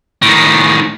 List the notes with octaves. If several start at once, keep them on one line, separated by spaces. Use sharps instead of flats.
A2 D#3